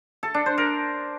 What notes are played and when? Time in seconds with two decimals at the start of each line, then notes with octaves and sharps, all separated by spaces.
0.23 A4
0.34 D4
0.46 C5
0.58 A#4